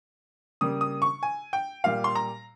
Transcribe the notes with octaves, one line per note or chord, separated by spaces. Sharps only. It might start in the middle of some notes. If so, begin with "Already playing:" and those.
C#3 G3 A#3 D#6
D#6
C#6
G#5
G5
A#2 G3 A#3 F5
C6
A#5